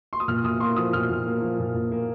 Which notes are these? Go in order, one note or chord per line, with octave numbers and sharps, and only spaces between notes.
C6
D#6
A#2 F6
A#2 D#6
A#3 C6
F3 D#6
A#2 F6
A#2
A#3
F3
A#2
A#2
A#3